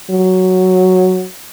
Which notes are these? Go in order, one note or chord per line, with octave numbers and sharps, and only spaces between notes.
F#3